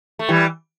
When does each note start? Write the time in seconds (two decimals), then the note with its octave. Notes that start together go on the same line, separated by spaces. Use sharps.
0.19 A3
0.29 E3 G3